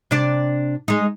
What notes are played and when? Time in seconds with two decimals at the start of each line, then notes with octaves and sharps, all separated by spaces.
0.11 C3 D4 D5
0.88 G#3 D#4